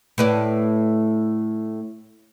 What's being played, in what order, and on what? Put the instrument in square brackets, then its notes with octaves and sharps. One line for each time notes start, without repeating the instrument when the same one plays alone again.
[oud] A2 B4 D5